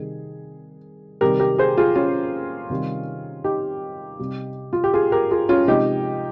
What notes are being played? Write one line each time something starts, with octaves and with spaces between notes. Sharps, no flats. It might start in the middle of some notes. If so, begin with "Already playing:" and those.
Already playing: C3 D#3 G3 G#4
C3 D#3 G3 G4 A#4
G4 A#4
G#4 C5
F4 G#4
C#4 F4
C3 D#3 G3
D#4 G4
C3 G3
F4
G4
F4 G#4
G4 A#4
F4 G#4
C#4 F4
C3 F3 G#3 D#4 G4